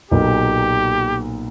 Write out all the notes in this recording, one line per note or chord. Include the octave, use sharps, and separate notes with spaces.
B1 A#2 A#3 G4